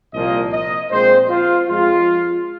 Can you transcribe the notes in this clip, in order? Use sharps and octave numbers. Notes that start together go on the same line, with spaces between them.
C2 A#2 F3 A#3 D#5
D#5
A#1 A#2 G#3 C4 C5
F4
F2 F3 G#3 C4 F4